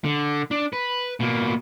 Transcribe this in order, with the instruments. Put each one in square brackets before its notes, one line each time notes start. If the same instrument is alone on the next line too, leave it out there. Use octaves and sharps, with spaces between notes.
[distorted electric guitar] D3
D4
B4
B2 A#3